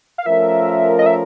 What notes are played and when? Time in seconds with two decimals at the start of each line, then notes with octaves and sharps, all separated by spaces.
0.18 F5
0.26 F3 A3 C#4 F4 A#4 E5
0.99 D#5
1.06 E5